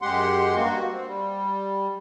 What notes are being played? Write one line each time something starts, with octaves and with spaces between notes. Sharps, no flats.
F#2 G#3 G4 F#5 C6
G2 A#3 F#4
C4
G3